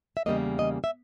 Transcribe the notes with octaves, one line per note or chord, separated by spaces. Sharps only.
E5
E2 C#3 G3 A#3 D#5
D#5
E5